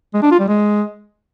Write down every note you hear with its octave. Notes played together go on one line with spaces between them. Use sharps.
G#3
D4
F4
G3
G#3